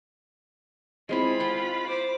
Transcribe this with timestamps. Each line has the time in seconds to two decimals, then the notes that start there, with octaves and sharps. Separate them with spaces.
1.09 G#3 C4 E4 F4 B5
1.40 F#5 G5
1.86 C5 D6